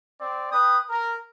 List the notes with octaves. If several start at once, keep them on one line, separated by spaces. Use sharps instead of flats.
C4 D5
B4 G5 D#6
A#4